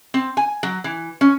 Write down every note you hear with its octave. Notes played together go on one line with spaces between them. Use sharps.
C4
G#5
F#3
E3
C#4